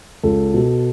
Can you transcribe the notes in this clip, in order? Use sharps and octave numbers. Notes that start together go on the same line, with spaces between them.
C#2 A4
B2